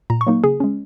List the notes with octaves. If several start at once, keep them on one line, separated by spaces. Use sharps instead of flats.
A#2 A#5
C#6
F#3 A#3 D#4
C#3 G#4
G#3 C#4